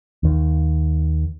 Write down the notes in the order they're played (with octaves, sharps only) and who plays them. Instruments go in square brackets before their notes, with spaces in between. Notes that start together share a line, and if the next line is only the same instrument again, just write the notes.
[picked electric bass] D#2 D#3